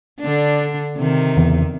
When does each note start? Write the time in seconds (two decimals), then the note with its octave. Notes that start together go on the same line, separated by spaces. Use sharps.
0.20 D3 D4
0.97 C3 D#3
1.37 E2 C#3 E3